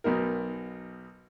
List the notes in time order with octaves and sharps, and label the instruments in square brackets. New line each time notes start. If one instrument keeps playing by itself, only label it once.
[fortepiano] B1 B2 D#4 A#4